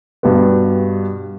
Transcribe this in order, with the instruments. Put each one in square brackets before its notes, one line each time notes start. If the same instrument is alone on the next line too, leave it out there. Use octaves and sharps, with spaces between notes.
[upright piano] G2 B2 G3 B3